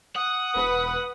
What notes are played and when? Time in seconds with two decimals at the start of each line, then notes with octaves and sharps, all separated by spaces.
0.16 F#5 D#6
0.55 E1 B4